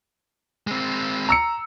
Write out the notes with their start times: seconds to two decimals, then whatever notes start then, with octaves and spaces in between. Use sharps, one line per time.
0.67 G#3 C4
1.29 A#5 E6 C#7